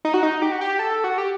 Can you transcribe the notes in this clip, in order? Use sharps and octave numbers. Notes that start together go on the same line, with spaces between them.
D#4
F#4
D#4
G4
F#4
G4
A4
F#4
G4